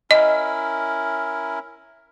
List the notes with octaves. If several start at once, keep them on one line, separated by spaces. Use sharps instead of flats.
C#4 E4 A#4 D#5